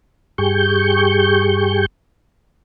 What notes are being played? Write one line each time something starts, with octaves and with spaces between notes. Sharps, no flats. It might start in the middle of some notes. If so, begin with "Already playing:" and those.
G2 G4 G#4 C#6 G6